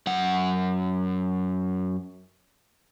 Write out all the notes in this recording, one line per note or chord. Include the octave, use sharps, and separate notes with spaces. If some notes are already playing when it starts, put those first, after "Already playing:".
F#2 F#5